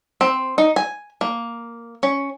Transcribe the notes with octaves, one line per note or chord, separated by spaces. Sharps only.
C4
D#4
G#5
A#3
C#4